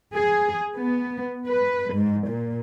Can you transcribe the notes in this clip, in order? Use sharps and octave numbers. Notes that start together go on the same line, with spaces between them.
G#4
B3
B4
G#2
A#2